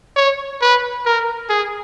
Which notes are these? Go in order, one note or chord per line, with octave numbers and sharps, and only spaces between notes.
C#5
B4
A#4
G#4